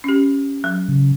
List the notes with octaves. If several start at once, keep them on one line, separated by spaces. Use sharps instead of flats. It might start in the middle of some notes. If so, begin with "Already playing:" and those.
C#4 G4
F#3
C#3